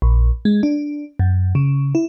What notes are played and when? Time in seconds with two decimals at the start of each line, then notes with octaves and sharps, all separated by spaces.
0.02 A#1
0.45 G#3
0.63 D4
1.19 F#2
1.55 C#3
1.95 E4